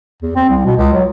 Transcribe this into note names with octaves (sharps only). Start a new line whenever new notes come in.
E2
C4
C2
B2
C#2
F#3